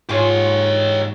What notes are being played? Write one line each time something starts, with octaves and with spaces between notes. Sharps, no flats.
G#2 F4 G4 C#5